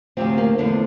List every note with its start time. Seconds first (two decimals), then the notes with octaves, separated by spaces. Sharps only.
0.17 D2 C3 F3 C4
0.38 A#3
0.58 E2 D3 F3 A3